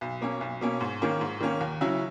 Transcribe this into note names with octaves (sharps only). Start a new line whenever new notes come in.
B1
B2 A#3 C#4
B1
B2 A#3 C#4
G#2
D#3 A#3 C#4
G#2
D#3 A#3 C#4
D#2
C#3 F#3 C#4 E4